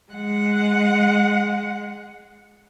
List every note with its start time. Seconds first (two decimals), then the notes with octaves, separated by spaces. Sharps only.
0.12 G#3 F#5